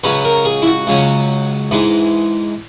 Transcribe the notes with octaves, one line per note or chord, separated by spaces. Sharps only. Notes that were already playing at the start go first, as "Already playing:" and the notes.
C#2 C#3 F#3 C#4 B4
A#4
G#4
E4
F#4
C#2 C#3 F#3 C#4
G#2 E3 G#3